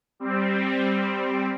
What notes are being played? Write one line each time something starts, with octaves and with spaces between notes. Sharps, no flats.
G3 C4